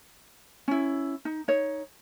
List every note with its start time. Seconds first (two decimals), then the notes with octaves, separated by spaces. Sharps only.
0.68 C#4 E4
1.25 D#4
1.48 D#4 C#5